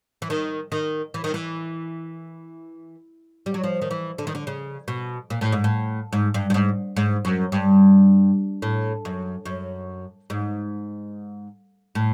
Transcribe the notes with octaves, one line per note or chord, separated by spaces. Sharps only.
E3
D#3
D#3
E3
D#3
E3
G3
F#3
F3
D#3
E3
D3
D#3
D3
C#3
B2
A#2
A2
G#2
A2
G#2
G2
G2
G#2
G#2
F#2
G2
A2
F#2
F#2
G#2
A2